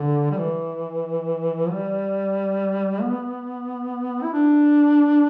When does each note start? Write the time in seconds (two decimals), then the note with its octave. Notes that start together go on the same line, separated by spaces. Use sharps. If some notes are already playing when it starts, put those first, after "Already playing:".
Already playing: D3
0.31 G3
0.38 E3
1.69 G3
3.02 B3
4.23 E4
4.33 D4